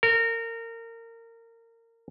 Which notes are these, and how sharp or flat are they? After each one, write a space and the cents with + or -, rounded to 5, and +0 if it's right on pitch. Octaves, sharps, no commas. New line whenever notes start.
A#4 -25